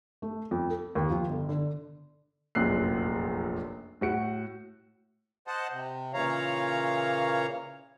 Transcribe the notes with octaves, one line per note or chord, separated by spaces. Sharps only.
A3
F2
A4
D#2
F3
G1
D3
F1 A#1 F#2 A#2 F#6 C7
A2 F#4 C#7
C5 D#5 F#5 A5
C3
A#2 C#3 E3 C#5 F5 A#5